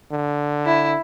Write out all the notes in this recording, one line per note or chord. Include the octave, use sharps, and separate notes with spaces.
D3
E4